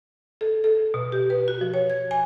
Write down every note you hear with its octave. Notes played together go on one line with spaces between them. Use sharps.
A4
A4
B2
G4
B4
F#4
F3
C#5
G#6
G#5